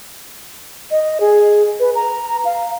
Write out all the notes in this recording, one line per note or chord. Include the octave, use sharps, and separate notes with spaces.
D#5
G#4
B4
A#5
F5